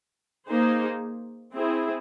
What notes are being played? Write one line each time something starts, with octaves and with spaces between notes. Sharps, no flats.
A#3 D#4 G#4 C5
C4 E4 G#4